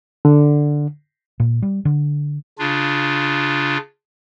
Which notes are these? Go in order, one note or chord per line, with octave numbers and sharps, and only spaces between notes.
D3
A#2
G3
D3
C#3 D4 F4